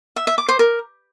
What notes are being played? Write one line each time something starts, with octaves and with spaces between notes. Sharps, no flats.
E5
E5
D6
C5
A#4